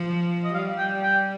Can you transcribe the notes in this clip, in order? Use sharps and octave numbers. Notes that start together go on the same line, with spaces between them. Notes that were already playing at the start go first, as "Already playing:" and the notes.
Already playing: F3
D#5
G3 F5
G5
G5